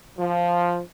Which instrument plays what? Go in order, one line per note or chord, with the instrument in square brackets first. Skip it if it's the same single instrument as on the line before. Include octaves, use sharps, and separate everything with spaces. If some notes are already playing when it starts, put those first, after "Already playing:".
[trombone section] F3